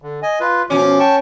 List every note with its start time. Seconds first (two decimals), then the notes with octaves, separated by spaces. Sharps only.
0.02 D3
0.23 D#5 G#5
0.40 F4 B4
0.70 B2 F3 C#4 D6
1.00 G5 A5 C#6